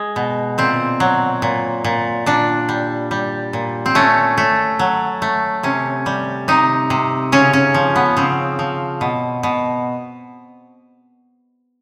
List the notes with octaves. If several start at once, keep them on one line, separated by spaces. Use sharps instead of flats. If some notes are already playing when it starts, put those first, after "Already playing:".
Already playing: G#3
B2
A#2 C4
F#3
A#2
A#2
A#2 D4
G3
G3
A#2
C4
A3 C#4
A3
F#3
A3
C3 C#4
G3
C3 D#4
C3
C#3 C#4
C#4
F3
B3
C#3 C4
F3
B2
B2